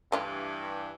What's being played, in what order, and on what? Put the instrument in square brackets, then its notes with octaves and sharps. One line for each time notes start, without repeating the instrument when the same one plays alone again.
[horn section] G2 E3 [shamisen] A3 D4 F4